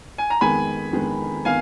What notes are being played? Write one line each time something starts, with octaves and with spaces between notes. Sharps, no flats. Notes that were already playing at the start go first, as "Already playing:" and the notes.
G#5
A#5
F2 D#3 G#3 B3 G#5 B5
F2 D#3 G#3 B3
D#3 B3 F5 G#5